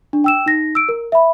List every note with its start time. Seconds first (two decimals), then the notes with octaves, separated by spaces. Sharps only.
0.13 D4
0.24 G5 E6 E7
0.46 D#4 A#6
0.75 E6 D7
0.89 A#4
1.12 E5 B5